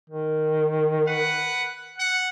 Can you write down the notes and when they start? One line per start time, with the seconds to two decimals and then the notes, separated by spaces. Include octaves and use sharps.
0.10 D#3
1.08 B4 F#5
1.97 F#5